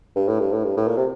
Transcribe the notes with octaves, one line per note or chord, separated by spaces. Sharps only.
G2
A2
G2
A2
G2
A2
A#2
C3